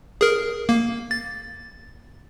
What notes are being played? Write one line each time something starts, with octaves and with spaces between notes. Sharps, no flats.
G#4 A#4
A#3
A6